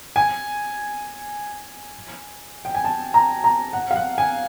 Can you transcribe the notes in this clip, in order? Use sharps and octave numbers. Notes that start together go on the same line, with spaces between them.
G#5
G5
G#5
A5
A#5
A#5
F#5
F5
F#5
G#5